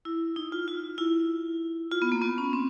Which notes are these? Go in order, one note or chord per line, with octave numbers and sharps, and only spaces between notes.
E4
D#4
F4
F4
E4
F4
B3
A#3
B3
C#4
C4